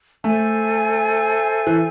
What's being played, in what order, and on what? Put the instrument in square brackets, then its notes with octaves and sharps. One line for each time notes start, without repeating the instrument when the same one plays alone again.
[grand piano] A3 [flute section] A4 C5 E5 G#5
[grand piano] E3